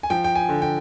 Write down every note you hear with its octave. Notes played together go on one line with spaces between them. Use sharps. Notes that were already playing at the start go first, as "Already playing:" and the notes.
G#5
F3 G5
G5
G#5
D3
G5